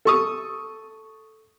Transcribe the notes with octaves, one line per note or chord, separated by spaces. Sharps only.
A4 C#6 D#6